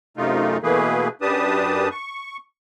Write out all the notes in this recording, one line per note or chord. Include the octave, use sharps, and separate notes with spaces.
F#2 C3 A3 D#4 F4
B2 E3 A3 A#3 G#4 B4
F#2 D4 G4 B4 A5 D#6
C#6